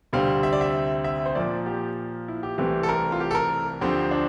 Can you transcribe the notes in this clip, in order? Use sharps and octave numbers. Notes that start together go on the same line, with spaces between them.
D2 C3 G3 C4 F5
E5
D5
E5
E5
C5
A#2 F3 A#3 D5
G4
E4
G4
C2 C3 E3 A3 C4 G4
A4
A#4
F4
G4
A4
A#4
D2 D3 F3 C4 G4
D4